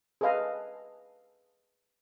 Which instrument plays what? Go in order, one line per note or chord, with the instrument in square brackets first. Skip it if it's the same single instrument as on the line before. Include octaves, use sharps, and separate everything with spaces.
[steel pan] G#4 A4 B4 D#5 F5